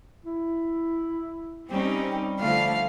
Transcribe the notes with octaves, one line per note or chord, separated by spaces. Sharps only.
E4
G3 C4 C#4 D#4 G4
D3 F3 A3 F5